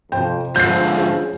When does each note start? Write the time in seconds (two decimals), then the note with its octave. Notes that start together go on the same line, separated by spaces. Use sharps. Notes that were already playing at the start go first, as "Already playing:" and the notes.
0.12 F2 C3 C5 G5
0.56 G#2 D3 F3 C4 C5 G6 C7
0.93 C#4 G#4